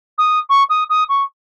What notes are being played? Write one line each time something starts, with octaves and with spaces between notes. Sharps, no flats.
D#6
C#6
D#6
D#6
C#6